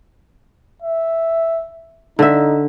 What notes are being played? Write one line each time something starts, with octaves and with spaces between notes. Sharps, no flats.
E5
D3 D#4 E5